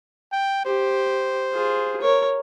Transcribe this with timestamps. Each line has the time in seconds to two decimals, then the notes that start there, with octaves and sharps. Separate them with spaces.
0.32 G5
0.65 G4 C5
1.54 F4 G#4
2.01 A#4 C#5